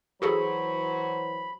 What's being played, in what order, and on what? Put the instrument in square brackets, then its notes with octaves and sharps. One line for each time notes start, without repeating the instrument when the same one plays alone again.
[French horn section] E3 F#3 C5 [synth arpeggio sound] F#4 G#4 A4 [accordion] B5